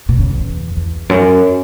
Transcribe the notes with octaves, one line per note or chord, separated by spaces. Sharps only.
B2
C#3
E2
E2
F#2